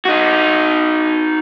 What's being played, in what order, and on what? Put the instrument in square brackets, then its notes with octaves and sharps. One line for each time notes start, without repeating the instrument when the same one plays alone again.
[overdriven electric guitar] D#4 F#4